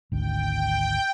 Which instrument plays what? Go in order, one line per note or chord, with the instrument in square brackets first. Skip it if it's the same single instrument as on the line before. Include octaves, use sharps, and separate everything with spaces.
[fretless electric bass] G#1 D2 [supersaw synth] G5